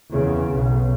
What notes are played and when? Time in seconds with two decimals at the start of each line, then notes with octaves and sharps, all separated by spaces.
0.10 E2 C#3
0.52 B1